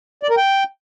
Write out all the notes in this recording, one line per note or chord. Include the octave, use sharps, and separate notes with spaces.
D5
A#4
G5